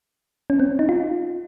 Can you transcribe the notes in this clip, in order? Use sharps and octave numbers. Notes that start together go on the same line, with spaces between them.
C#4
C4
D#4
F4